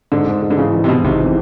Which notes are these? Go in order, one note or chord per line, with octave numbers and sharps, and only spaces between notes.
G#2 D3
G#2
G#2
D3
C#3 E3
E3
C3
B2 E3
G#1 C3
E3